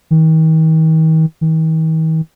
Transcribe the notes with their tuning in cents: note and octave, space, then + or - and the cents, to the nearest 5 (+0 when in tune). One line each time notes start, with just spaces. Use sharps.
D#3 +40
D#3 +45